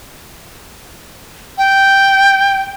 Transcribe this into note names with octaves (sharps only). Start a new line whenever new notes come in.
G5